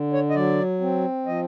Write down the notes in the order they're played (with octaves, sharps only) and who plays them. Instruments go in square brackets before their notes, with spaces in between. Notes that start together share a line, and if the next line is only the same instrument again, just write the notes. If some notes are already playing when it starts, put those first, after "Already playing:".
Already playing: [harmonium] D3
C#5
D#5
F#3 D5
C4
F3 D#5